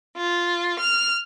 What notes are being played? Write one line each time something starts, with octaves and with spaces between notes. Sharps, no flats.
F4
F6